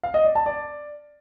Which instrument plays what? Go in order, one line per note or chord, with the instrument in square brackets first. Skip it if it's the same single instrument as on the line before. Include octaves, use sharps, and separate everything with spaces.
[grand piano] F5
D#5
D5
A5
D5